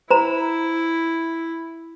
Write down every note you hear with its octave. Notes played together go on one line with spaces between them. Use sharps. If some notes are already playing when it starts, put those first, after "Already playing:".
E4 C5 A#5